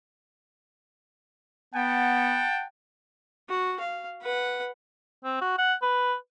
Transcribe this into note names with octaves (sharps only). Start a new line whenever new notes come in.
B3 F#5 G5 A5
F#4
F5
B4 F#5
C4
F#4
F#5
B4